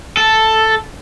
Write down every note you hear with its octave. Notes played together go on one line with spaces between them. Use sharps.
A4